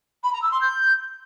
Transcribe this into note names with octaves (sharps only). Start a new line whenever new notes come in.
B5
A#5
E6
C6
G6